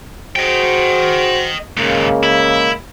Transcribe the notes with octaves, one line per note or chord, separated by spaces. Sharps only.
F#4 G#4 C5 D#5 G5
D#2 A#2 C#3 G#3 A#3
E4